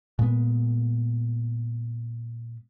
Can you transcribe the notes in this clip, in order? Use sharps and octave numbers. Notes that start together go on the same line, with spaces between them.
A#2 G#3 B3